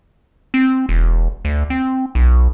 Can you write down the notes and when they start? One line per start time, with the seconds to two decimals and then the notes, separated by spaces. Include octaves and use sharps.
0.54 C4
0.89 E1
1.45 D2
1.70 C4
2.15 B1